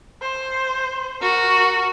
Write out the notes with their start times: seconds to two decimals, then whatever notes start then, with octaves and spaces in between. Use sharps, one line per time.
0.21 C5
1.22 F#4 A#4